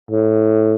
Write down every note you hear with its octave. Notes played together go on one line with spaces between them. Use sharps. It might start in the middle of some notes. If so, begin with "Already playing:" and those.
A2